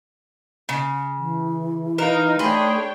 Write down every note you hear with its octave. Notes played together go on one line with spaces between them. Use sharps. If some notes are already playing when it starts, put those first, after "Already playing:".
C#3
E3
D#4 A#4 B4 F5
A3 D4 G#4 C#5 G5 B5 C6